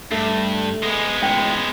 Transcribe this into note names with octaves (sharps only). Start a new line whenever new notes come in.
G2 A3
G#3 B3
C#2 A2 G5